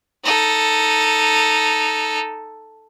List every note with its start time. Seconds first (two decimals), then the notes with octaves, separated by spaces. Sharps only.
0.24 D#4 A4